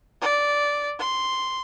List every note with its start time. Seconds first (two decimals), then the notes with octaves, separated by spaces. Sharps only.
0.22 D5
0.99 C6